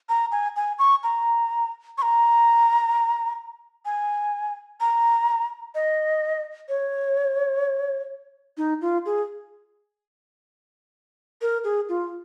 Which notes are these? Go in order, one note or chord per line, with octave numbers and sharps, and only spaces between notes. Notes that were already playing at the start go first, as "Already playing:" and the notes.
A#5
G#5
G#5
C#6
A#5
C#6
A#5
G#5
A#5
D#5
C#5
D#4
F4
G#4
A#4
G#4
F4